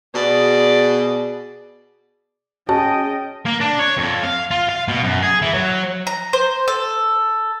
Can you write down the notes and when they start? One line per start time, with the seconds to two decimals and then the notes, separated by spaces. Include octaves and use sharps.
0.15 B2 G#4 D5
2.69 C#4 F#4 G#4 D#5 G5 A5
3.45 A#3
3.60 D4
3.79 C#5
3.97 F2
4.23 F5
4.51 F4
4.69 F5
4.88 B2
5.04 F#2
5.22 G#4
5.42 E3
5.54 F#3
6.07 A#5
6.33 C5
6.68 A4